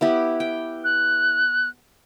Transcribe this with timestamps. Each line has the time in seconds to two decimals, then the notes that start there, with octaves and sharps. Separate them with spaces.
0.01 B3 E4 G4
0.40 G5
0.84 F#6